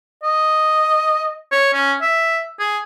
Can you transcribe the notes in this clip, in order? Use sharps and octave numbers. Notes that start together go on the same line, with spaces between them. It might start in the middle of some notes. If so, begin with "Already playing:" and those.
D#5
C#5
C#4
E5
G#4